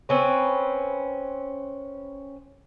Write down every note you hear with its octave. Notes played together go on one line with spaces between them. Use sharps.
C4 C#4 B4